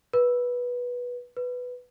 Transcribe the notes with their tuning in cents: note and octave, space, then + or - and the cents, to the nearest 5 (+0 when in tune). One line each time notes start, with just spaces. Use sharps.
B4 -15
B4 +5